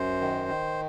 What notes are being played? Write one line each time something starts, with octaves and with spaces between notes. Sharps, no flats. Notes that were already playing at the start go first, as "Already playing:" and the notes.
Already playing: F#2 C5
D#3
D#3